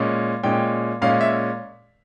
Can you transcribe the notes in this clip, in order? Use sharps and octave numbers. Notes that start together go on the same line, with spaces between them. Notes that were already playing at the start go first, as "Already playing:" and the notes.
Already playing: A#2 G#3 C#4
A#2 G#3 C#4 G5
A#2 G#3 C#4 F5
E5